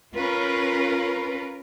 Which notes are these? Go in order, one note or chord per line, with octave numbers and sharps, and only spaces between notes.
C#4 F4 A#4 B4